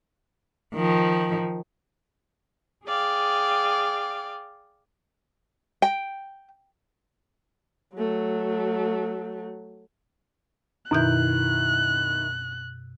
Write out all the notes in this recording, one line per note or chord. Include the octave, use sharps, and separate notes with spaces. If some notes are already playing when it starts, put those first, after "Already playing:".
D#3 F3
G#4 D5 F5 G5
G5
F#3 A3
F#2 B2 D#3 E4 F#6 G6